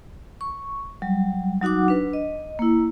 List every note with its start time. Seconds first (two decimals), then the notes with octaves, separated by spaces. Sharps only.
0.41 C#6
1.02 F#3 G3
1.62 F#3 D#4 F#4 F#5 D6
1.88 D4 B4
2.13 D#5
2.59 A#3 E4